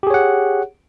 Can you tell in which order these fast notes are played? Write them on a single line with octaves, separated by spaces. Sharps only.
G4 G#4 C#5 F#5